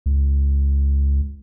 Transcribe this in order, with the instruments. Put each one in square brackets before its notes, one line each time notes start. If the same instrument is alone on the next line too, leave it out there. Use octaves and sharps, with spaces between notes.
[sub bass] C#2